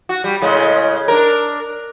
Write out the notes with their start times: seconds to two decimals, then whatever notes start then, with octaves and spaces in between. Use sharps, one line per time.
0.09 F#4
0.24 G3
0.42 A2 C#3 G#3
1.08 D4 A#4